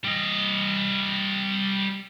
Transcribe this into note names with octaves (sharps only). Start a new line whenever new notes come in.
G3 D#5